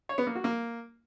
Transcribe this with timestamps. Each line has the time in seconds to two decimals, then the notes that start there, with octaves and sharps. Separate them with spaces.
0.09 C#5
0.18 B3
0.27 A#3
0.35 F#4
0.44 A#3